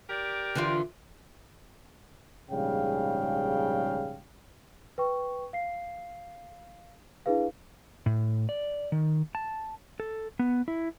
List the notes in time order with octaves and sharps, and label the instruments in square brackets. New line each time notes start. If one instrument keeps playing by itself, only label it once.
[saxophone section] G4 A#4 D5
[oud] D3 E3 F4
[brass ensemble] A#1 G#2 C#3 G3 F5 G5
[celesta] B4 G5 C#6
F5 C7
D4 E4 G#4 B4 F5
[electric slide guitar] A2
D5
D#3
A5
A4
B3
E4